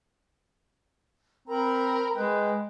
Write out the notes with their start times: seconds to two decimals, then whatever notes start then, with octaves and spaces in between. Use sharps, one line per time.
1.48 C4 A#4 A#5 B5
2.15 G#3 B4 G5